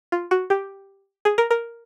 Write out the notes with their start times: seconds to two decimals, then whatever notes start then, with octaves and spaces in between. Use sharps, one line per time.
0.12 F4
0.31 F#4
0.50 G4
1.25 G#4
1.38 A#4
1.51 A#4